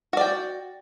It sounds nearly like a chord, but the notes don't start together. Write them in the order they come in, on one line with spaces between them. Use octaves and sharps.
F#4 D5 G5